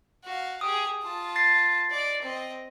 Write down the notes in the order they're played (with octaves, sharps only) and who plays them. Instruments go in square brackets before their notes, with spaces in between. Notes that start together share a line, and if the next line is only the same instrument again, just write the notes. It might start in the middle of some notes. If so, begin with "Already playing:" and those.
[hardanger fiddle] F#4 F5
[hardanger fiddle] G4 G#4 [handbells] D#6
[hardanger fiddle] F4 A5
[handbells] A6 C7
[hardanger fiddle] D5 D#5
C4 D#5